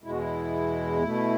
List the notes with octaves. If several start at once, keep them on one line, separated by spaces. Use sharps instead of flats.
E2 B2 G#3 E4
F#4
E4
B2 A3